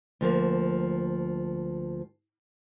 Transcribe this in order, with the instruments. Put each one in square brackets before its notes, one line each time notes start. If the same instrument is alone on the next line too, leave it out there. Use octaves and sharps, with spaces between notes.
[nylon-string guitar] D2 F3 A#3